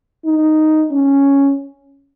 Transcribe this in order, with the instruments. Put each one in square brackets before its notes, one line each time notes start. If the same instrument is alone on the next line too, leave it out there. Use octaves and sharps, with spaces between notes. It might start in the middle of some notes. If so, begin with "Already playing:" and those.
[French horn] D#4
C#4